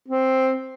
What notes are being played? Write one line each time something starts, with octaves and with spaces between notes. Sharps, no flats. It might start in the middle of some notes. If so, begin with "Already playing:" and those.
C4